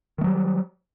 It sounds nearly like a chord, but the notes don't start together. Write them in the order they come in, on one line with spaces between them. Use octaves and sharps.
D#3 A3 F#3 G3